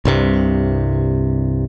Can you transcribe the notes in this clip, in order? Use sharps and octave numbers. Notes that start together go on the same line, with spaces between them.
C2 G2 C3